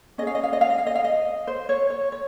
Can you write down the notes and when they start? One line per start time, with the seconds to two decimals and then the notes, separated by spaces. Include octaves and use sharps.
0.18 C#4 D#5
0.22 G#4
0.27 F5
0.35 D#5
0.43 F5
0.53 D#5
0.61 F5
0.70 D#5
0.78 F5
0.87 D#5
0.95 F5
1.04 D#5
1.47 C5
1.69 C#5
1.90 C#5
2.12 C#5